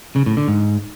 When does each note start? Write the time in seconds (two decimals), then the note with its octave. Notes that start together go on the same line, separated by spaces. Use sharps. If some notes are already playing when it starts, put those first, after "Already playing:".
0.16 C#3
0.26 A2
0.37 D3
0.48 G#2